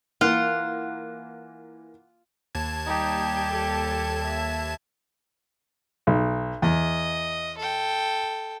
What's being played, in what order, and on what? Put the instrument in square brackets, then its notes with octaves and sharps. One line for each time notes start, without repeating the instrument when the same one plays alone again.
[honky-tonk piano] E3 A#3 [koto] F4 [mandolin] F#5
[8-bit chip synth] D#2 A5 G#6
[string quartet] G3 G4 [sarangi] D#4
[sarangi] A4
E5
[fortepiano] B1
[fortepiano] E2 [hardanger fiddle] D#5
[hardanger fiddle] A4 G5